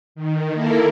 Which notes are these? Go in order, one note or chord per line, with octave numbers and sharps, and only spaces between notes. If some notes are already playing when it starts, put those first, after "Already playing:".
D#3
A#3 E4 A4 A#4